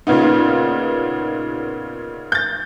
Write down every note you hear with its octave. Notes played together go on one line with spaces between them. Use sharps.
A#2 C#3 B3 D#4
G6 A6